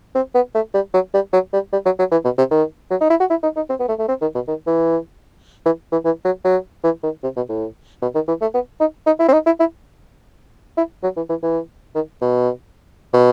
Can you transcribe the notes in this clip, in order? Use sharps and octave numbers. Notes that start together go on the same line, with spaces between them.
C4
B3
A3
G3
F#3
G3
F#3
G3
G3
F#3
F#3
E3
B2
C3
D#3
F#3
D#4
E4
F#4
E4
D#4
D#4
C4
B3
A3
A3
C4
D#3
B2
D#3
E3
E3
E3
E3
F#3
F#3
E3
D#3
C3
B2
A2
B2
D#3
E3
A3
B3
D#4
D#4
E4
C4
D#4
E4
E4
E4
F#3
E3
E3
E3
D#3
B2
B2